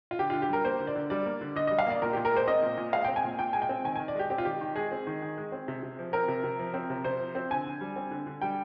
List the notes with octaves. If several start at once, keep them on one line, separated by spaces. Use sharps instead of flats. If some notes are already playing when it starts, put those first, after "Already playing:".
F4
D3 G4
D3 F4
G4
G3 A#4
A#3 C5
D3
D5
D3
G3 D5
A#3
D3
D3 D#5
G3 D#5
F5
A#3 D5
A#2 A#4
A#2 G4
A#4
G#3 C5
C4 D#5
A#2
A#2
G#3 F5
C4 G5
G#5
A#2
A#2 G5
G#3 G#5
G5
C4
D#3 G#5
D#3 G#5
D5
G#3 G4
C4 G4
F4
D#3 G4
D#3
G#3 G#4
C4
D#3
D#3
G#3
C4
C3
C3
F3
C4 A#4
C3
C3
F3
C4
C3
C3 C5
F3
C4
D3 G#5
D3
G3
C4
D3
D3
G3 G5